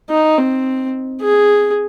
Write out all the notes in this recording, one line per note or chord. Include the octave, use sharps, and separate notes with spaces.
D#4
C4
G#4